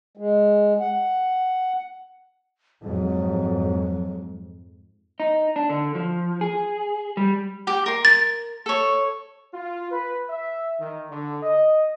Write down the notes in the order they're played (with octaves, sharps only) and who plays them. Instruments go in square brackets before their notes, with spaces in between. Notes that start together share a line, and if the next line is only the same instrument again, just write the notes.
[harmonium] G#3
F#5
[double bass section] F2 G#2 [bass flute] F#3
[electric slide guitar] D#4
D4
D3
F3
G#4
G3
[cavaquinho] G4 G5
A#4 C6
[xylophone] A6
[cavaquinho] A4 C#5
[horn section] F4
B4
E5
D#3
D3
D#5